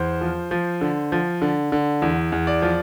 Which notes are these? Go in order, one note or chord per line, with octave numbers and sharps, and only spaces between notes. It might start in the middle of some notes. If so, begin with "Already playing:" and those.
Already playing: E2 C5
F3
F3
D3
F3
D3
D3
E2
E2
D5
F3